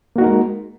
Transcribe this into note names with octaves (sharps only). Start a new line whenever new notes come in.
G#3 A#3 D#4 F#4 A#4